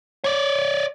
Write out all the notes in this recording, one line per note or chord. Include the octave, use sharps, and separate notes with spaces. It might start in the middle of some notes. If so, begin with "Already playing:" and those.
C#5 D5